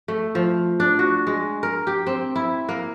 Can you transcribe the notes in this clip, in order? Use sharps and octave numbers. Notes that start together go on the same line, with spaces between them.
A3
F3
D4
F#4
G#3
A#4
G4
C4
E4
A#3